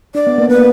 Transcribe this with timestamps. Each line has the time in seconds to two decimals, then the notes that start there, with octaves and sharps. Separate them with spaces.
0.15 D4 D5
0.27 B3
0.38 A#3
0.49 B3 B4
0.58 A#3